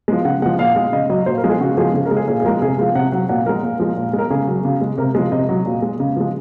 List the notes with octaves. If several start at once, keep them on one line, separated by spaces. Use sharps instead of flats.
F3 G#3
C#3 F#5
F3 G#3 F#5
A#2 F5
G#3 F5
C#3 D#5
F#3 D#5
A#2 C5
A#4
F3 G#3
G#4
C#3 F#4
F3 G#3 G#4
C#3 G#4
A#4
G#3
G#4
A#2 G#4
G#4
F3 G#3 A#4
C3 G#4
F3 G#3 F5
C3 F#5
F#3 F#5
A#2 F#5
F3 G#3 A#4
A#2
F3 G#3
A#2
G#3
A#4
C#3 G#4
F#3
C#3
G#3
C3 A#4
F3 G#3
C3 D#5
F#3
A#2
G#3
C#3
F3 G#3